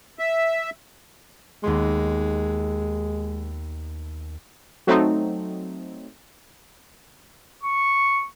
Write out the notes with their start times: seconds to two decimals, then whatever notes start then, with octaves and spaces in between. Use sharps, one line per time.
0.19 E5
1.64 D#2 G#3 B3 C6
4.87 F#3 A3 C4 D#4
7.63 C#6